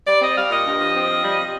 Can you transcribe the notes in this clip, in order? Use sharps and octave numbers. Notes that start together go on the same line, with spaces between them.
G3 D5
C4 D#5
G3 F5
A#2 D#5
G2
F3
C4
F3
G3
C3